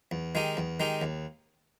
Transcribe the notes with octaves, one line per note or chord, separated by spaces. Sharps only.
E2
D#3 G#3 D#4 G4
E2
D#3 G#3 D#4 G4
D#2